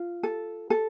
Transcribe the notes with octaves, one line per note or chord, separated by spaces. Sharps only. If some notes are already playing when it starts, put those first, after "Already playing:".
Already playing: F4
A4
A4